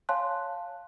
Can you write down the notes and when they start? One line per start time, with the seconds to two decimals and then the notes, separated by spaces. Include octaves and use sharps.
0.09 C#5 F5 G#5 A5 C6 F#6